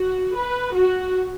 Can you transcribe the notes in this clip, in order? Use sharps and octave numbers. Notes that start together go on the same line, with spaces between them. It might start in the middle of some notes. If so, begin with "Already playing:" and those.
Already playing: F#4
B4
F#4